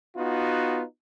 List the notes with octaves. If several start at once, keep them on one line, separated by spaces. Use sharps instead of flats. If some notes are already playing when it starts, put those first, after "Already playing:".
B3 D#4 F4 F#4